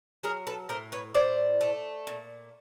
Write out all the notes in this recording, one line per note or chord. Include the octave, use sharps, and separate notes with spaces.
F#3 G#4 A#4
A4 B4
A2 A#4 C5
B4 C#5
A2 C5 D5
A3
A#2